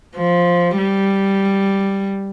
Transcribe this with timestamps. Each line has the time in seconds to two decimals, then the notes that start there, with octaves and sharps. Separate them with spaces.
0.16 F3
0.77 G3